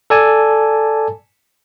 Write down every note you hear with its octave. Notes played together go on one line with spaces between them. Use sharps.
A4 D5 G#5 A5